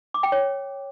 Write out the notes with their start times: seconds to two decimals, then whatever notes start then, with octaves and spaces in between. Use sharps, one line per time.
0.14 D6
0.23 G5
0.32 C#5